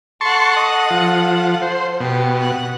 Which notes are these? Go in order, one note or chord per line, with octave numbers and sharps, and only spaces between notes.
A4 F#5 A5 C6 C#6
D#5
F3
C5
B2 G4
F#5